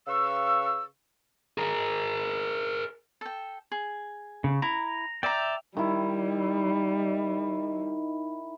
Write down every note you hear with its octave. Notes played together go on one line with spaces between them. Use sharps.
C#3 B4 F5 C#6 E6
G#4 A#4
A4 G5
G#4
C#3
E4 A#5
D5 E5 G5 A#5
D#3 G3 D#4 E4